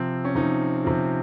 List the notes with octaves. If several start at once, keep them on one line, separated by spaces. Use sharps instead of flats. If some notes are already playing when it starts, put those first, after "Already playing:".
Already playing: C3 F3 C4
C#4
C3 F3 D#4
C3 F3